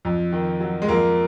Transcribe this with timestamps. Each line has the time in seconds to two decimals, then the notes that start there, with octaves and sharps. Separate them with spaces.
0.05 F2
0.32 D#3
0.60 F#3
0.82 G#3
0.88 F2 A#3